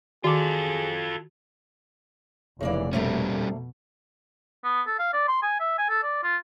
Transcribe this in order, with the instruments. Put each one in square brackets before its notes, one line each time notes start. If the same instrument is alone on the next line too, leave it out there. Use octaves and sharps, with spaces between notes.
[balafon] D#3 D6 [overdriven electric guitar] F4 A4 [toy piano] F#4 [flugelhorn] G#4
[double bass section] F1 E3 [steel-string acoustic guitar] C#3 A#3 D5
[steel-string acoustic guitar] D2 A3 A#3 [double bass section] B2 [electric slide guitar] G3 C#4
[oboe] B3
A4
F5
D5
C6
G#5
E5
G#5
A4
D5
F4